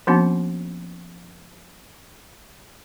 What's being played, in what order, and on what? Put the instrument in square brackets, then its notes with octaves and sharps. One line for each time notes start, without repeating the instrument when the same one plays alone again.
[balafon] F3 A#3 B3 C#4 D4 F#4